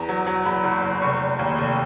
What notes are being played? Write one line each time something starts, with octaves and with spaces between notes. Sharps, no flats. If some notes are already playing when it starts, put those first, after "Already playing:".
Already playing: E2 A#5
F#3
F#3
E2 B5
F#1
F#1
F1 C#6
F1
D#2
F1